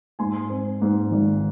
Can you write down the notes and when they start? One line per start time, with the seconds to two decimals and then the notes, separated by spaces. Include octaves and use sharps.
0.19 G#2 G#5 C6
0.49 C4
0.82 G#2
1.11 G#1